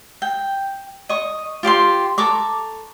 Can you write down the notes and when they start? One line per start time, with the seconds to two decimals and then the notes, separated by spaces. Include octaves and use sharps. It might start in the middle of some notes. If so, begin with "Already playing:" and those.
0.22 G5
1.09 D#5 C#6
1.63 F4 G4 C5 C6
2.18 A4 A#5 C#6 D6